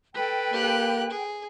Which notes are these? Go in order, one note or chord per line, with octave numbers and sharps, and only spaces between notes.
A4 B4 G5
A#3 G4 F#6
G#4